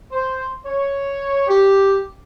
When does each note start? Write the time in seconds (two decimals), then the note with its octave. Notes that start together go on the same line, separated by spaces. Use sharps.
0.12 C5
0.65 C#5
1.48 G4